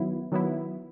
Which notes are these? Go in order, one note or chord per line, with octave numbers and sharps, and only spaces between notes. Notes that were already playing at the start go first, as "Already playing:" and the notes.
Already playing: D#3 F#3 B3 E4
D#3 F#3 B3 E4